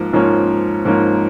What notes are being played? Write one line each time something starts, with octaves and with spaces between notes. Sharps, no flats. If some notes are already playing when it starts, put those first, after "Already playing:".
Already playing: G#2 F3 A#3
G#2 F3 A#3 C#4
G#2 F3 A#3 C#4